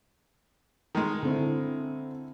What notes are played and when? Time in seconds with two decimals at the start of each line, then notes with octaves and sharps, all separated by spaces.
0.95 D#3 G#3
1.23 D3 C4 E4